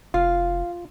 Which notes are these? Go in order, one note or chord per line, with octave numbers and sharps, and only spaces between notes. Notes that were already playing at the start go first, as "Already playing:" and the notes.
F1 F4 F5